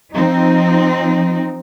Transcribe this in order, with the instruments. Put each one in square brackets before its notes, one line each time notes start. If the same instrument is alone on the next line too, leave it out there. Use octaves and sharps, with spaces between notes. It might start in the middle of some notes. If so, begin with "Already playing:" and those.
[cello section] F3 C4 D#4